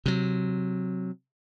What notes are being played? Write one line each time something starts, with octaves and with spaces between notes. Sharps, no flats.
C3 F#3